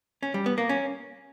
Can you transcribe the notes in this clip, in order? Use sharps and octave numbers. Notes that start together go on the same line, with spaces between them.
C#4
G3
B3
A#3
C#4